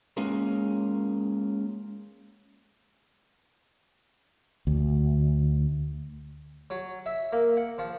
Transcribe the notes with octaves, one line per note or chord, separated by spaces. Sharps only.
G#3 A#3 C#4 F4 G#4 A#4
D2
F#3
E5
A#3
F#5
F3